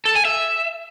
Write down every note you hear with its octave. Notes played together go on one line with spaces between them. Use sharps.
A4
G#5
E5